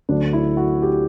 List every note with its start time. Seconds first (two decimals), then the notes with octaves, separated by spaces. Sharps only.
0.09 D2 D3 F#3 D4
0.33 E4
0.57 F#4
0.82 G4